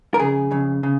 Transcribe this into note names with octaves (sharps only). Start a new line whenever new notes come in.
A#4
F2 C#3 G#4
F2 C#3
C#3